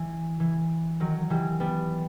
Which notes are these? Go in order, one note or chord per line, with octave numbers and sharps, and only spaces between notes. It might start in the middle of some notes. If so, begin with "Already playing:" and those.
Already playing: E3
E3
D#3 F#3
E3 G3
G3 B3